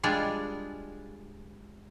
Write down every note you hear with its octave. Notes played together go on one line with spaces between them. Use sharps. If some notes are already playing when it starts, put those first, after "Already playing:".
G3 G#3 D4 F4 G#4